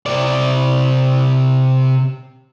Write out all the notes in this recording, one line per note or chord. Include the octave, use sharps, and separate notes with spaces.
C3 D5